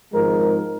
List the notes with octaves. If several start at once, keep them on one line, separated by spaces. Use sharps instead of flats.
G#1 G#2 F3 G#3 A#4